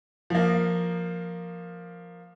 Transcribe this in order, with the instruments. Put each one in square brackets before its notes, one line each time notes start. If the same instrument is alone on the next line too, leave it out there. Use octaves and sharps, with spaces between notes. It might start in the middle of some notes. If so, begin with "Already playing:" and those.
[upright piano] F3 A#3